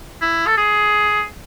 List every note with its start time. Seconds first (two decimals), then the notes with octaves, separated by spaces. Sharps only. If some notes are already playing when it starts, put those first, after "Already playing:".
0.21 E4
0.47 A4
0.57 G#4